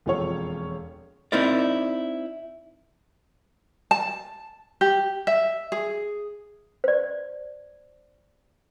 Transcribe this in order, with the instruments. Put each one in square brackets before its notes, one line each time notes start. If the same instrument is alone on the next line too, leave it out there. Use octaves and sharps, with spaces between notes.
[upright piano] E1 F2 F4 A4 C#5
[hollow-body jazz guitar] C4 D#4 E4 A#4 D5
[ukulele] A5
G4
E5
G#4
[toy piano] C5 D5